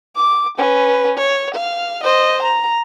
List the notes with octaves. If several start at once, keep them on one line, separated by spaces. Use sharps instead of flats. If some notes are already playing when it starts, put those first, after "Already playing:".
D6
C#4 B4
C#5
F5
C5 D#5
A#5